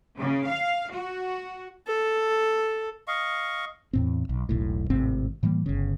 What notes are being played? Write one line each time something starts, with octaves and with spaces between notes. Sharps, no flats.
C#3
F5
F#4
A4
D#5 F5 C#6
E2 A2 C4
B1
E1 B1 A2
G#1 A2 C3 C4
A2 E3 G3 A#3
G1 C#3